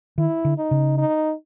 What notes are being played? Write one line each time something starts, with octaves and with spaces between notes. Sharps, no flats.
D#3 E4
D3
D#4
C#3
D#4